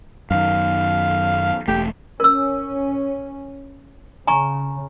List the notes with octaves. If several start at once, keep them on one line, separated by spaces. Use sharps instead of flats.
F#2 D#3 F5
E1 A3 G4
C#4 A#4 E6
C#3 G#5 A#5 C#6